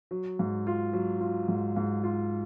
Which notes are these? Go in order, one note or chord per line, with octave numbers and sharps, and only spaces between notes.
F#3
G#2
F4
F#3
F4
G#2
G#2
F4